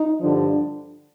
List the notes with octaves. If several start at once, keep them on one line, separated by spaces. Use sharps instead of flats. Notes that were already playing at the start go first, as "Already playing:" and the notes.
Already playing: D#4
G2 D3 F3 D4